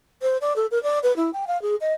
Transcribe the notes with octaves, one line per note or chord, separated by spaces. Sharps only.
C5
D5
A4
A#4
D5
B4
E4
G5
F5
G#4
D#5